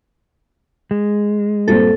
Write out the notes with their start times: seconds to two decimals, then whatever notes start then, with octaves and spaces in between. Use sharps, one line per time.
0.91 G#3
1.68 G2 A#2 C4 A4